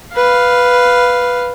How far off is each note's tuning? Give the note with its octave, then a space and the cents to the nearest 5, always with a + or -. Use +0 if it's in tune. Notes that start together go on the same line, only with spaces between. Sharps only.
B4 +0 F5 +0